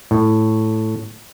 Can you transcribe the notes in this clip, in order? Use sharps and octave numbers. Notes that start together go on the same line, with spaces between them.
A2